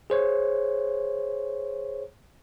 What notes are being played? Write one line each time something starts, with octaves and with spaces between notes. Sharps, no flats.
G#4 C5 C#5